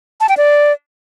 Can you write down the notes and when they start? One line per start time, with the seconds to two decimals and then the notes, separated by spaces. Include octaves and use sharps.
0.20 A5
0.29 G5
0.37 D5